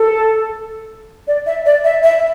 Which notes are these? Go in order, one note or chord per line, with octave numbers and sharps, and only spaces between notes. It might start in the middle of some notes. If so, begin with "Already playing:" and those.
Already playing: A4
D5
E5
D5
E5
E5